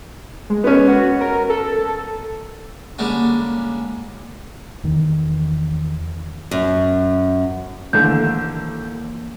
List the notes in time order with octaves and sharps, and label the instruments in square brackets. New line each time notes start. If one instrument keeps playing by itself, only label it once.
[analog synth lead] G#3
[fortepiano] B3 C#4
[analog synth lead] F#4
A#4
A4
[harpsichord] D3 G3 G#3 A#3 C#4
[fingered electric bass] E2 D#3
[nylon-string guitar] F#2
[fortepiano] D#2 D3 A3 [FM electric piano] E3 A#3 [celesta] G6